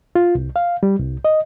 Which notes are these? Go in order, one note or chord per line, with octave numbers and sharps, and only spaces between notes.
F4
C2
F5
G3
C2
D#5